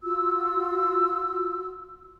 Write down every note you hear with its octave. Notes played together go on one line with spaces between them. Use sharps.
F4 F#4 E6